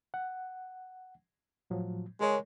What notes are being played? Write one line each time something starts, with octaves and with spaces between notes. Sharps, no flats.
F#5
A2 F3 F#3
G#3 G#4 A#4 C#5